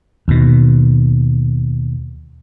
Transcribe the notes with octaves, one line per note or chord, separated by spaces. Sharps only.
D#2 B2